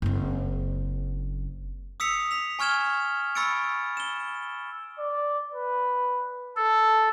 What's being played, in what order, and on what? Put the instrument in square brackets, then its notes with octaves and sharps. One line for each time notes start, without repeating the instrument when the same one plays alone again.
[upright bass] F#1 C4
[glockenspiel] D#6 E6 B6 C#7 F7
B6 F7
G#5 C#6 F6 G#6 E7 G7
B5 C#6 E6 A6 C#7 D7
E7 G7
[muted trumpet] D5
B4
[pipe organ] A4 [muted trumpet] A5